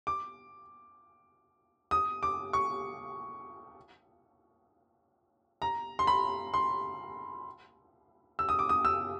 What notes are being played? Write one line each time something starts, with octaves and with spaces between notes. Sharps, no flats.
D6
D#6
D6
C#6
A#5
C6
B5
C6
E6
D#6
D6
D#6
E6